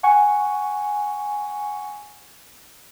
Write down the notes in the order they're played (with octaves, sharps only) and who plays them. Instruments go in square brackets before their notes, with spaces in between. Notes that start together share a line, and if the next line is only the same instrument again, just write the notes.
[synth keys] F#5 G#5 C#6